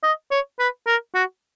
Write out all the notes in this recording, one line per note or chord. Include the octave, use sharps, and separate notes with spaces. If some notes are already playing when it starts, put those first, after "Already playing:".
D#5
C#5
B4
A#4
F#4